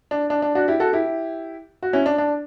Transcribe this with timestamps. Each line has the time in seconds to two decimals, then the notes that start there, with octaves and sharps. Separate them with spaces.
0.11 D4
0.30 D4
0.42 D4
0.55 D4 F#4
0.68 E4 G4
0.80 F#4 A4
0.93 E4 G4
1.83 F#4
1.93 C#4 E4
2.06 D4
2.18 D4